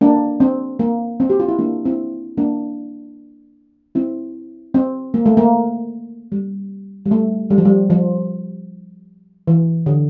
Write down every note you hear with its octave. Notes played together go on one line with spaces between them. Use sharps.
A#3 D4
C4
A#3
C4
G4
F4
E4
A#3 D4
C4 E4
A#3 D4
C4 E4
C4
A#3
A3
A#3
G3
G3
A3
G3
F3
G3
F3
E3
D3